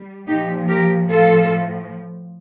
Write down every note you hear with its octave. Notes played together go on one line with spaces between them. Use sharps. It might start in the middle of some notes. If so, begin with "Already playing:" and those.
Already playing: G3
A#2 F3 D#4 G4
G4 A#4
A2 F3 F4 A4